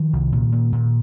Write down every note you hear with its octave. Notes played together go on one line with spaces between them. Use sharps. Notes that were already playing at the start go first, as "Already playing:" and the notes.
Already playing: D#3 F3
C2
A#2
A#2
A#2